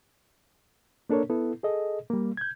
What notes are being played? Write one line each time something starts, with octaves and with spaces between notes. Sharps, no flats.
A#3 D4 A4 A#4 C#5
B3 E4 A4
G#4 A4 D#5
G3 A#3
G6 G#6